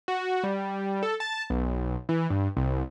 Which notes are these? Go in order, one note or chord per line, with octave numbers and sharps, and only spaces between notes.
F#4
G3
A4
A5
B1
E3
G2
C2